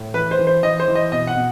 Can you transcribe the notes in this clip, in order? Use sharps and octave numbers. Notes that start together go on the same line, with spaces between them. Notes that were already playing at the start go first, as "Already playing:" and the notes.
Already playing: A2
E3 B4
C5
E3
C5
E3 D#5
C5
E3
D#5
B2 D#5
F#5
B2